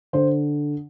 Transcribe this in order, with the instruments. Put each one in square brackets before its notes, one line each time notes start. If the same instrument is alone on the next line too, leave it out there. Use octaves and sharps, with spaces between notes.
[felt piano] D3 C5